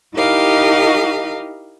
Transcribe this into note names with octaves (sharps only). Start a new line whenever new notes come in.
D#4 E4 G4 A#4 D#5 F5